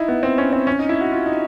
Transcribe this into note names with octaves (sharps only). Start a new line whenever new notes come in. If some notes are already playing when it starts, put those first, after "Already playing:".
Already playing: D#4 E4
B3
C4
C#4
C4
C#4
D#4
E4
F#4
F4
D#4